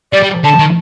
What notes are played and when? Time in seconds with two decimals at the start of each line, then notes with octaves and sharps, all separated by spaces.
0.12 G3 D5
0.23 G3
0.44 D3 A5
0.59 D#3